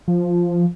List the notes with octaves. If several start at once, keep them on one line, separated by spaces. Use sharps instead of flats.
F3